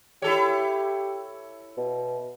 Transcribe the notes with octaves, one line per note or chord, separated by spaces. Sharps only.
E4 G4 A4 C#5
B2